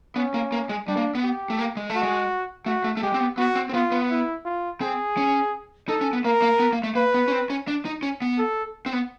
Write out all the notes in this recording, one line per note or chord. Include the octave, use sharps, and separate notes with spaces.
B3 C#4
A#3
A#3
G#3
G3 D4
A#3
B3
G4
A3
A#3
G#3
A3
F#4
G#3
A3 F#4
A3
A3
G#3 G4
C4
B3
B3 F#4
C4
C4
B3 F4
B3
E4
F4
C4 G#4
C#4
D#4 A4
C#4
B3
A#3 A#4
A#3
B3
A#3
A3
A#3 B4
B3
C#4
C4
C#4
D4
D#4
C#4
B3
A4
C4
B3